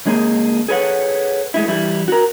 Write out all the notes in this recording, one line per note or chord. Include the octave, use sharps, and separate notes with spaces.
C#3 G#3 A#3 C4 G#4
G#4 A4 B4 C#5 E5 F#5
G#3 A3 E4
E3 G3 E4
F#4 A#4